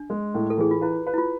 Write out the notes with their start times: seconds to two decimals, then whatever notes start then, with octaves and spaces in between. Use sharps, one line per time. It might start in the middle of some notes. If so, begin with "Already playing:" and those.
Already playing: D4
0.10 G#3
0.34 A2
0.50 A4
0.58 E3 G#4
0.71 F4
0.81 E4 B4
1.06 B4
1.14 E4
1.18 F4